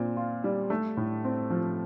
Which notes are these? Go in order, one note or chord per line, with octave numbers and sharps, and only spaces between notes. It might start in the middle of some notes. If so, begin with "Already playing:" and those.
Already playing: A#2 C4
F4
G3
A3
A2
C4
F3